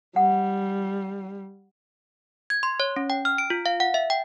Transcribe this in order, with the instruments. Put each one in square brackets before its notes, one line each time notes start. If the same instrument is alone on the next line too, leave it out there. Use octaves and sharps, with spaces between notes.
[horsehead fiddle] G3 [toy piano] F#5
[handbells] G#6
C6
C#5
C#4
G5
F6
D7
F4
F5
F#5
E5
G5